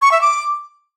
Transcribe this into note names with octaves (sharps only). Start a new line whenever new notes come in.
C#6
E5
D6